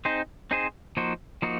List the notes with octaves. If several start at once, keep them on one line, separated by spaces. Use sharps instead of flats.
C4 D#4 G#4 C5
C4 D#4 G#4 C5
F3 A#3 D#4 F#4 C5
F3 A#3 D#4 F#4